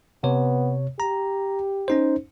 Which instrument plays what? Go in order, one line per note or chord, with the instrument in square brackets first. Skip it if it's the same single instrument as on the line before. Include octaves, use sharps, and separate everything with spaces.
[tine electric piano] C3 C#5 [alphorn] B3
[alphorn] G4 [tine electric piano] A#5
[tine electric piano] C#4 D#4 C5